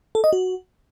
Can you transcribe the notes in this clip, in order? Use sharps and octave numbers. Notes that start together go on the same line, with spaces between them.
A4
D#5
F#4